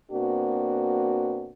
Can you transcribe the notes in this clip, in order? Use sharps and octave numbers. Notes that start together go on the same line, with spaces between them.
B2 A#3 C4 D4 F#4